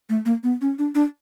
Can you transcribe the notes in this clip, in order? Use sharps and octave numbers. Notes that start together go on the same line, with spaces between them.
A3
A#3
B3
C#4
D4
D4